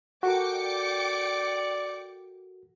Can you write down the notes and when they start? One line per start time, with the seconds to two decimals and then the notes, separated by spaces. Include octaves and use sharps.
0.23 F#4 A4 A#4 G5 D6 C#7
0.53 D5